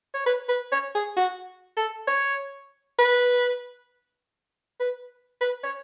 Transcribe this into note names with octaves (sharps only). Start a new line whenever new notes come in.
C#5
B4
B4
C#5
G#4
F#4
A4
C#5
B4
B4
B4
C#5